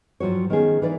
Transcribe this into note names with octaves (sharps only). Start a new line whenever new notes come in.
G2 F3 F#3 F#4 C#5
D#3 B3 C#4 G#4
E3 D#4 B4 D5